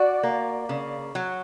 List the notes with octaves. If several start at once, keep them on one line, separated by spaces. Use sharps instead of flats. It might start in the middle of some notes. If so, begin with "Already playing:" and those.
Already playing: F#4 D5
A#3
C#3
F#3